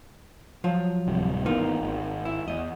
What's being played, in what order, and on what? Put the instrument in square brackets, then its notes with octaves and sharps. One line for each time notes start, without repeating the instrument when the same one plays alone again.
[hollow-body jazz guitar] F3 F#3 F4
[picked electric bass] D1 C3 G3
[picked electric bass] G#1 E3 B3 [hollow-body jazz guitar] A#3 D#4 F4
[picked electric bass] G#1
[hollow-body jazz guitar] E4
[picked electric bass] E2 [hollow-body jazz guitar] D#5